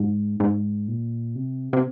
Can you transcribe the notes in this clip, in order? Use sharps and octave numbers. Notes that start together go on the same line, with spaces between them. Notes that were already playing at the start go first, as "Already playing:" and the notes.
Already playing: G#2
G#2
A#2
C3
C3